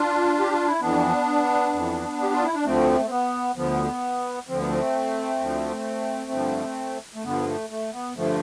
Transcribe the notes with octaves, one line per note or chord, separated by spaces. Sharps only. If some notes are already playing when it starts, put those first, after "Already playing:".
Already playing: D4 F4
G4
F4
E4
F2 E3 B3 D4
F2 E3
G4
F4
E4
D4
D2 D3 F3 A3 C4
C4
B3
D2 D3 F3 B3
D2 D3 F3 C4
B3
A3 C4
D2 D3 F3
G2 D3 F3
A3
G2 D3 F3 B3
A3
A3
B3
G2 D3 F3 A3